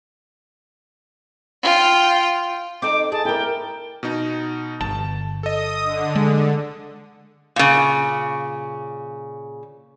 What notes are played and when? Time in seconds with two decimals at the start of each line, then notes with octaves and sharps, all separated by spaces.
1.63 F4 G5
2.82 C4 D#4 A4 D6
3.12 G#4 A5
3.25 E4 A#4 G5
4.03 B2 D#4
4.81 G1 A5
5.43 A4 D#5 D#6
5.84 D3
6.15 G#3
7.56 A#2 C#3